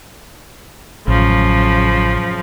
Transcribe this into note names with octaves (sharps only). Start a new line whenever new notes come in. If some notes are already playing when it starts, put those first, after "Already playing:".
A1 F#2 C#3 F3